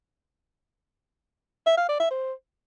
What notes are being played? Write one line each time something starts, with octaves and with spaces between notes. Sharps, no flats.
E5
F5
D5
E5
C5